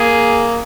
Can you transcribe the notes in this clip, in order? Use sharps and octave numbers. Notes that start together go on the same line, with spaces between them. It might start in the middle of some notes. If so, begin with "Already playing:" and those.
Already playing: A#3 G#4